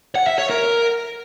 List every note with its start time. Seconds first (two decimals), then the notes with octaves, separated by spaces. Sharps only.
0.15 F#5
0.27 E5
0.38 C#5
0.50 A#4